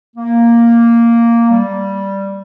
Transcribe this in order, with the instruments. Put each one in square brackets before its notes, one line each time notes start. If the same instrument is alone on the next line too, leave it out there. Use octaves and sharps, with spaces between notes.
[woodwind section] A#3
G3